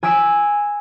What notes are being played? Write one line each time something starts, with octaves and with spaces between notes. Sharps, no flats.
G#5 E6 B6 D7 E7